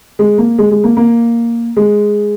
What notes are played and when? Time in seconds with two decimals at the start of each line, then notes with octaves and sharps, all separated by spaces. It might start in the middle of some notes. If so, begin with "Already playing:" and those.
0.19 G#3
0.38 A#3
0.58 G#3
0.71 G#3
0.84 A#3
0.97 A#3
1.77 G#3